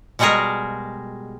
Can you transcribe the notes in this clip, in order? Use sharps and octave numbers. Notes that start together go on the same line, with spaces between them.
B2 G3 G#3 F#4 G#4 A#4